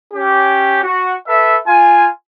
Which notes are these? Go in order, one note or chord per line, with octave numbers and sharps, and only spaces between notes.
C#4 G4
F#4
A4 B4 E5
F4 G#5